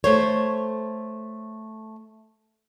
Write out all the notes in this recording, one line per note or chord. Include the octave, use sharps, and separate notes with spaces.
A3 C5 C#5